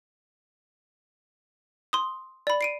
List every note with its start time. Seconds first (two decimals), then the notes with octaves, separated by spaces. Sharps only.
1.93 C6 D#6
2.47 D5 B5
2.61 C7 D7 D#7